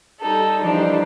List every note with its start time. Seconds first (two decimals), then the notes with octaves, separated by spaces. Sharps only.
0.22 G3 D#4 A4
0.61 E3 F3 G3 D4 D#4